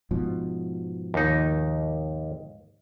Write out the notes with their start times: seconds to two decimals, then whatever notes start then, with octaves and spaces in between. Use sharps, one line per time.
0.11 G#2 B2 F3
1.14 D#2 D#4